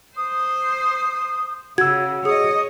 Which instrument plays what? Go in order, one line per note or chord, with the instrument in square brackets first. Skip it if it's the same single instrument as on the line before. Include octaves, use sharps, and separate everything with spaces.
[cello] C5 [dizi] D#6
[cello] C#3 [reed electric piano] F#4 E6 [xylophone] G#6
[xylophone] G#4 [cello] C#5 D#5 [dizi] D#6